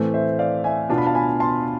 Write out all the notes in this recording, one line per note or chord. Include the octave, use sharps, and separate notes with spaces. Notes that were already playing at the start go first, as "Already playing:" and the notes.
Already playing: A2 E3 A3 C4
C5 E5
D5 F5
E5 G#5
B2 B3 D4 F4 A5
B5
F5 A5
G#5 B5
A5 C6